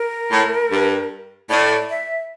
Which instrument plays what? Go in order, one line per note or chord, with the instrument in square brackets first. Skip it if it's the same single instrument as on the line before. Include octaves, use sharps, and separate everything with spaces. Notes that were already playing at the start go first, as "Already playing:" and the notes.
Already playing: [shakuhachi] A#4
[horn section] A2
G2
[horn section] A2 [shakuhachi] D5
[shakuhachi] E5